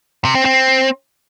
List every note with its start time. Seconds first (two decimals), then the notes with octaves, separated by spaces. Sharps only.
0.25 C3
0.35 C4
0.45 C4